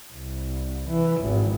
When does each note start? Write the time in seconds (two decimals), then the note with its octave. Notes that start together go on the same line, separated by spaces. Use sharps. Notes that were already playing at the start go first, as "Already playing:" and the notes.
0.13 C2
0.89 E3
1.21 G#1